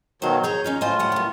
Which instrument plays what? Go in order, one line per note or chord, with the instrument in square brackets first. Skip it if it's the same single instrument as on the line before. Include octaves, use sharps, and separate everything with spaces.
[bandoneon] B2 D#3 F#3 [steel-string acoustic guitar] C5 F5
[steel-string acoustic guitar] G#4 C#5 A#5 [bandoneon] G6
[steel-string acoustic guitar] C#4 D#4 F4
[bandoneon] A2 F4 [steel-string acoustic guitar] C5 D#5 G#5
[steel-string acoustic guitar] F#3 G3 F#5
D#2 B3